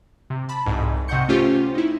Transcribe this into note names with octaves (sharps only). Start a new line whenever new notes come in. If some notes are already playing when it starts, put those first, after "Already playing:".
C3
A5 B5
C2 F2 G#2
C3 D#5 F#5 C#6 G6 C#7
A3 C#4 F4 G4 C5
D#4 E4